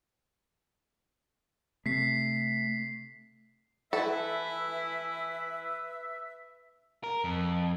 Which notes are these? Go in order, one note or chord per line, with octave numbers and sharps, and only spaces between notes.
C3 A3 B6 C7
E3 E4 A4 B4 E5
A#4
F2